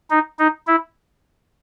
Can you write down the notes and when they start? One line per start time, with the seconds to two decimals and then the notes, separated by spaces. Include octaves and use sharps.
0.10 D#4
0.39 D#4
0.67 E4